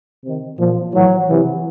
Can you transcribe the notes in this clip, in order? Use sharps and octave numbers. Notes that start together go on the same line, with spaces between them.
C3 D#3
A#2 F3
A2 E3 F#3
C3 E3